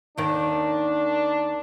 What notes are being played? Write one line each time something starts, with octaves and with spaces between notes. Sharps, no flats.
D#2 D#3 D4